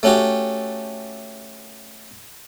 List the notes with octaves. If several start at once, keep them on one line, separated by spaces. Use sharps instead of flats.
A3 C#4 F#4 G4